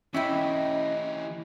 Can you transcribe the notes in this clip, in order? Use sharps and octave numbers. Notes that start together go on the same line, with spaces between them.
E3 C#4 E4 G4 D#5 E5 G5 B5